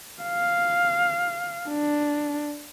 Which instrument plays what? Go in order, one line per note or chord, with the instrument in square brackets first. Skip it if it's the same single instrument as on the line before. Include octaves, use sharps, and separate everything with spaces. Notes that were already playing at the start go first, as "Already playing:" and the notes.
[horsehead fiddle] F5
D4